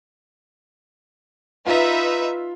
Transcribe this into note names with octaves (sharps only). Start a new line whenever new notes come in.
D#4 F4 B4 E5